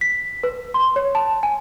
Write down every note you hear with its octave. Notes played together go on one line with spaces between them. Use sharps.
B6
B4
C6
C#5
A5
G#5